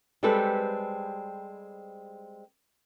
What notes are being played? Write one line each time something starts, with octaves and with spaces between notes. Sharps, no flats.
G3 G#3 C4 G4 A4 B4